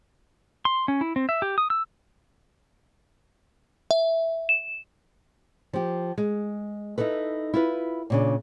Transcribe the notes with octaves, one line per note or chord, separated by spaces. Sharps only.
C6
C#4
E4
C4
E5
G4
D#6
E6
E5
E7
F3 G4
G#3
D#4 E4 A4 B4
E4 F4 B4
A#2 C#3 D4